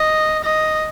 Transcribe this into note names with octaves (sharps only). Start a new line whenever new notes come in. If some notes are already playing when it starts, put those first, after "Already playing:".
Already playing: D#5
D#5